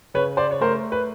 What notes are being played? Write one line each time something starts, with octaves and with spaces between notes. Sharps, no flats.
C#3 B4 C#5
C5 D5
C#5
A3 A#4 C5
B4